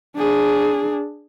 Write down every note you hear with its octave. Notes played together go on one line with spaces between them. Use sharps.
D4 G#4